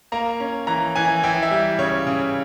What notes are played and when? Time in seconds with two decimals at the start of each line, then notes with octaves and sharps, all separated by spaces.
0.12 A#3 A#5
0.40 C#4
0.67 E3 A#5
0.95 E3 G#5
1.23 E3 G5
1.43 E5
1.51 G3
1.79 C#3 C#5
2.07 C#3